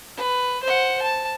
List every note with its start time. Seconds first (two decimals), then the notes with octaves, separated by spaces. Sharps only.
0.17 B4
0.63 C5 F#5
1.02 A5